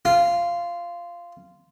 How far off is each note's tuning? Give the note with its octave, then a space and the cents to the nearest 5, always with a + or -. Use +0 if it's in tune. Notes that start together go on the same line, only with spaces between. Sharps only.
F4 -10